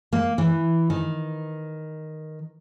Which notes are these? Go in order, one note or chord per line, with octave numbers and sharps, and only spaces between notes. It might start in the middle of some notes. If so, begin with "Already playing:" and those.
A#3
E3
D#3